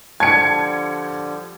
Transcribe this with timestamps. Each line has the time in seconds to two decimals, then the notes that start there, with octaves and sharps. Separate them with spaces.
0.20 D3 F3 G3 G5 A5 G#6 C#7